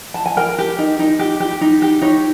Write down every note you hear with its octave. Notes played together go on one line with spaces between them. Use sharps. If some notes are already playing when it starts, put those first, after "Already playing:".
A5
G#5
A#4 G5
G4
D#4
D#4
G4
G4
D#4
G4
D#4 C#5